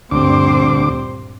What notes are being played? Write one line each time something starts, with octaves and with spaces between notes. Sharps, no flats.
D2 G2 A#2 G3 C4 C5 D6